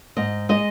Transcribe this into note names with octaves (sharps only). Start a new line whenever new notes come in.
G#2 D#5
G#3 D#5